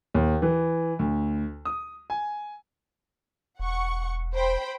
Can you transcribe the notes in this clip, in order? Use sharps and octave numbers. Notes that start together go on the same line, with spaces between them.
D#2
E3
D2
D#6
G#5
E1 F#5 C#6
C5 G5 B5